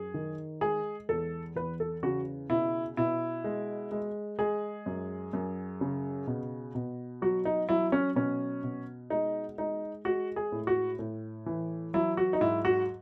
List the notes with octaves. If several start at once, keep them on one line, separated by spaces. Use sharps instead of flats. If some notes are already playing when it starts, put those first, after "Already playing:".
Already playing: F#2 G#4
D#3
G#3 G#4
E2 A4
E2 B4
A4
C#3 F#4
B2 E4
B2 E4
G#3
G#3
G#3 G#4
F#2
F#2
C#3
B2
B2
F#3 F#4
D#4
F#3 E4
C#4
B2 C#4
B2
G#3 D#4
G#3 D#4
G#3 F#4
G#4
A2
F#4
A2
E3
F#3 E4
F#4
D#4
G#2 E4
F#4